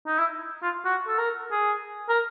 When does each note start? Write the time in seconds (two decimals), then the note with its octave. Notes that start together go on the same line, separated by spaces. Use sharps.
0.07 D#4
0.18 E4
0.62 F4
0.85 F#4
1.07 A4
1.18 A#4
1.51 G#4
2.09 A#4